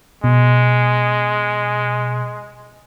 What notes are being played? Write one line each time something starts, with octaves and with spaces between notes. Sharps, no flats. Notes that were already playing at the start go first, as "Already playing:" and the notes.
B2 G#3